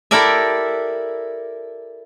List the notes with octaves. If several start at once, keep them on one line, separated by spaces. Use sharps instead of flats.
E4 G4 A4 A#4 D5 E5